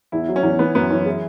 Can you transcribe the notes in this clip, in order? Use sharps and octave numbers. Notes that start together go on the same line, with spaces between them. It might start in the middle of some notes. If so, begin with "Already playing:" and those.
E2 E4
F#3
C#4
E2
E3 B3
F#2 B3
E3 C#4
E4 G#4